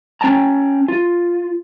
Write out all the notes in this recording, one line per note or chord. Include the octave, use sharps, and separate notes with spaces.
C#4 G5 A5 A#5
F4